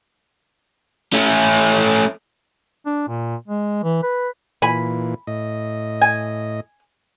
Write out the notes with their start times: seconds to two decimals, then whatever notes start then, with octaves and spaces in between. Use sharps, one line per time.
1.13 A3 C#4
2.86 D4
3.08 A#2
3.48 G#3
3.84 E3
4.03 B4
4.62 A#2 E3 G#5 B5
5.27 A2 D#5
6.01 G#5